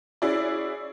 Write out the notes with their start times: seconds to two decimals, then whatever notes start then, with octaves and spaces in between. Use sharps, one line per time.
0.22 C#4 E4 F#4 G#4 D5